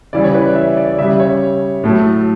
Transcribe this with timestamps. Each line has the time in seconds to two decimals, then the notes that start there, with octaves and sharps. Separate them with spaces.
0.13 C#3 E3 G3 D5
0.24 C#5
0.34 B4
0.45 D5
0.55 E5
0.77 D5
0.98 C#3 E5
1.01 G3
1.20 C#5
1.84 A2 F#3 A3